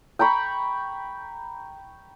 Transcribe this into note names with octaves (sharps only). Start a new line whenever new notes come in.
G5 A#5 B5 C#6